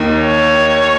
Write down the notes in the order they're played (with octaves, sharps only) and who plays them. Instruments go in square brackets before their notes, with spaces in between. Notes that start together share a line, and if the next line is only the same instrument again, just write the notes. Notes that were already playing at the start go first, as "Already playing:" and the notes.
Already playing: [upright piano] D#2 D#3
[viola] C#5